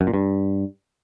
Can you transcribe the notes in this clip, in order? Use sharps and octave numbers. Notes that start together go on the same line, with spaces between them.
F#2
A#2
G2